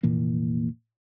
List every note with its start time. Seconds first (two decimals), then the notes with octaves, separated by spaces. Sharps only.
0.03 F1 A#2 E3 A#3